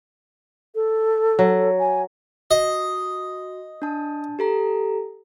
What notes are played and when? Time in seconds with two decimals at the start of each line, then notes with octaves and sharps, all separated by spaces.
0.75 A4
1.39 F#3
1.80 G#5
2.51 F#4 D#5
3.82 D4 A5
4.39 G4 A4 A#5